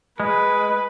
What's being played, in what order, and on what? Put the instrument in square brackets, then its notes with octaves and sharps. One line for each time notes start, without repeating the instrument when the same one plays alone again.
[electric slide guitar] G#3 [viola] B4